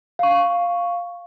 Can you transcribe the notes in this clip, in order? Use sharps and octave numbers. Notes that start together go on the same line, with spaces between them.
F5 C#6